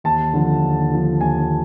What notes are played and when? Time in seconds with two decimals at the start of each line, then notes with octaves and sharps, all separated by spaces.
0.04 D#2 A5
0.33 D3 F3
0.62 D#2
0.91 D3 F3
1.20 D#2 G#5